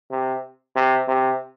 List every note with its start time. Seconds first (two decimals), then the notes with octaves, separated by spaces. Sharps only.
0.11 C3
0.75 C3
1.08 C3